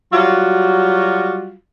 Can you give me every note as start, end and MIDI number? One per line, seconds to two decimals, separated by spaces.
0.13 1.54 54
0.13 1.54 55
0.13 1.54 65
0.13 1.54 66